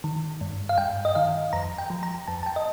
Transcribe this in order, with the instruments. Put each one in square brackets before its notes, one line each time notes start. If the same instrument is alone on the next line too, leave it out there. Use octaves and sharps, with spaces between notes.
[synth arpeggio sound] D#3
G2
F5
G2 G5
D#5
D#3 F5
F2 A#5
G5
F3
A#5
F2 A5
A5
G5
D#5